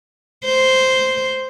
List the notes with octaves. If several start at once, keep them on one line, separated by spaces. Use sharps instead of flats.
C5